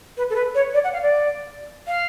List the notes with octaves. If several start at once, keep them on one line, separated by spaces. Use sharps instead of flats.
B4
A4
B4
C#5
D5
F#5
F5
D5
F5